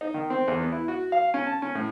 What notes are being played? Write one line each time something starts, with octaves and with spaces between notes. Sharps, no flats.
D#4
D#3
C4
E2
B3
E4
F#4
F5
C#4
A5
C#4
A2